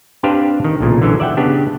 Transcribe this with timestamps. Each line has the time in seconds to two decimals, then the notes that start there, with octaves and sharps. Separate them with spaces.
0.23 C4 D4 G4 B4 C5 F5
0.64 D#3
0.80 B1 A#2 C#3
1.02 D3 E3 F#3 C#4
1.20 D5 E5 F#5 G5
1.37 C#3 B3 D4 G4